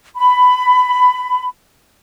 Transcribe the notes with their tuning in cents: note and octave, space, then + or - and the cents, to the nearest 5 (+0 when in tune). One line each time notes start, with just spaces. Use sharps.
B5 +15